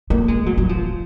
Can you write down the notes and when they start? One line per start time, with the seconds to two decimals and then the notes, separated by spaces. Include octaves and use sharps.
0.10 A#3
0.28 G#3
0.46 F#3
0.57 F#3
0.69 F3